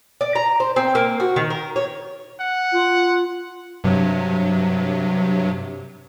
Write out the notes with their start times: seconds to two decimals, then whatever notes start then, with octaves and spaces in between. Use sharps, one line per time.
0.21 D5
0.35 A#5
0.60 C5
0.76 C4
0.95 A#3
1.20 F#4
1.36 D#3
1.50 A#4
1.76 C#5
2.40 F#5
2.72 F4
3.84 G2 C3 F#3